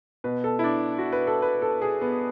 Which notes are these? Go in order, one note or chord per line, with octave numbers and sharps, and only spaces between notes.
B2 B4
A4
E4
D4
F#4
B4
A4
B4
A4
G#4
B3